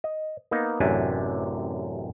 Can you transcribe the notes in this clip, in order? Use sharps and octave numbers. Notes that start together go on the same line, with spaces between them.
D#5
A#3 B3 D#4
A1 F#2 C3 D4 G4 G#5